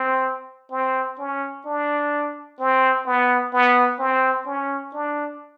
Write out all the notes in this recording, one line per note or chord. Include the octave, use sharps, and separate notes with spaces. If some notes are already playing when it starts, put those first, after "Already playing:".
Already playing: C4
C4
C#4
D4
C4
B3
B3
C4
C#4
D4